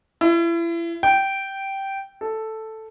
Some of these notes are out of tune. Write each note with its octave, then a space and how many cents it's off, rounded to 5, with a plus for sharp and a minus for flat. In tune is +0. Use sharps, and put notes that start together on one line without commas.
E4 +35
G5 -10
A4 +0